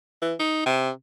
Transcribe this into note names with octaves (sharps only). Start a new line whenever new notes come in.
E3
D#4
C3